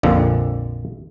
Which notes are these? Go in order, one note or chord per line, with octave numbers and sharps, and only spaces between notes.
A#1 F2 D3